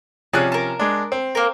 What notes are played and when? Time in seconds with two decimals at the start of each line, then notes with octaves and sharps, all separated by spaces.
0.33 C3 F3 C#4 G#4 D5 F#6
0.52 A#4 A5
0.79 G#3 D4
1.12 C4
1.35 A#3 A#4